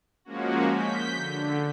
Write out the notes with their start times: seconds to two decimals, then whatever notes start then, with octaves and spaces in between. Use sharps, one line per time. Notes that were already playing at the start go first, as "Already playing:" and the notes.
0.25 F3 G#3 A#3 C#4 F#4
0.73 G6 B6
1.15 D3